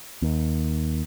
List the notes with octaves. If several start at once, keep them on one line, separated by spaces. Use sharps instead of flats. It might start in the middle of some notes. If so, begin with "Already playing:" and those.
D#2